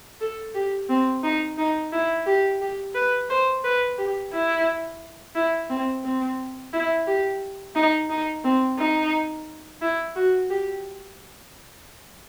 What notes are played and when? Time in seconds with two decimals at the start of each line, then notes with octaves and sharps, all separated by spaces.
0.21 A4
0.55 G4
0.89 C4
1.24 D#4
1.58 D#4
1.93 E4
2.26 G4
2.61 G4
2.95 B4
3.30 C5
3.64 B4
3.98 G4
4.33 E4
5.35 E4
5.70 C4
6.04 C4
6.73 E4
7.07 G4
7.76 D#4
8.10 D#4
8.44 C4
8.79 D#4
9.82 E4
10.16 F#4
10.50 G4